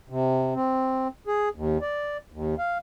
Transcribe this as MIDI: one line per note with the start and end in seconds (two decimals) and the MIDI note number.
0.09 0.54 48
0.55 1.08 60
1.27 1.49 68
1.55 1.78 39
1.81 2.17 74
2.32 2.55 39
2.58 2.78 77